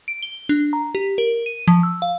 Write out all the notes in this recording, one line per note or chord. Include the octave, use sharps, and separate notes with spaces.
D7
G7
D4
A#5
G4
A#4
D#7
F3
E6
F5